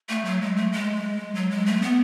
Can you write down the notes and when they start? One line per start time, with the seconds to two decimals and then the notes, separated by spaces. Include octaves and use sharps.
0.09 A3
0.25 F#3
0.41 G#3
0.56 A3
0.72 G#3
1.35 F#3
1.51 G#3
1.66 A3
1.82 B3